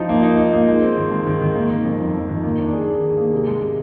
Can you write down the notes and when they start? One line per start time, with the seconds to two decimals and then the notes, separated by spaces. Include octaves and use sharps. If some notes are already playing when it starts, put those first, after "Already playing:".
Already playing: F3 D#4
0.09 A#3
0.23 D#4
0.38 D#4
0.53 A#3
0.68 G#3
0.82 C4
0.97 D#3
1.11 G#3
1.27 D#3
1.41 D#3
1.55 A#3
1.70 D#3
1.85 F2
2.00 F2
2.15 F2
2.29 D#3
2.43 A#3
2.59 D4
2.73 G#4
2.88 D#3
3.03 G#4
3.17 A#3
3.33 C3
3.47 G#3
3.62 C3